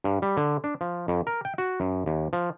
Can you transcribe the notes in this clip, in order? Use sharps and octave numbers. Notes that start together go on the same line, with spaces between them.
G2
G3
D3
D4
F3
F2
A#4
G5
F#4
F#2
D#2
F3